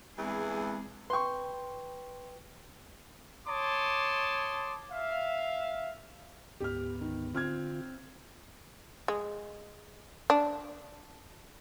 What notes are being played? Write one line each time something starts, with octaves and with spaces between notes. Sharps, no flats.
E2 G2 E3 G#3 C4 G#4
B4 G5 C6 C#6
C#5 A5 C6 D6 D#6
E5 F5
D2 G#2 B3 G4 F6
D#3
D3 C4 F4 F6 G#6
G#3
D4